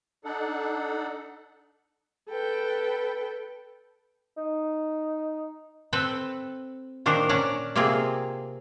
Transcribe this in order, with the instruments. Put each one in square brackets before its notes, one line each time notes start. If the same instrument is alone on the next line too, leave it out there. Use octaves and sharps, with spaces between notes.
[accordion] D4 D#4 A4 F#5
[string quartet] A4 B4 G5
[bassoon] D#4
[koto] C4 A4 B4 G5
A#2 D#3 D4 A#4 C5
C#4 D4 D5 A#5
C3 A#3 C4 F4 G#4